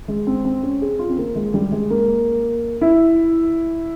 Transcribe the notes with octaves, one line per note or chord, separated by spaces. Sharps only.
G#3
C4
C4
C#4
G#4
F4
C4
A#3
G#3
G3
G#3
A#3
E4